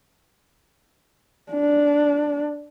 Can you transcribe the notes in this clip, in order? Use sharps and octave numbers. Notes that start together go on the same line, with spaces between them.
D4